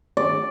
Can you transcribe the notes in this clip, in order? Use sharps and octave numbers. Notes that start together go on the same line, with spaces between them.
D5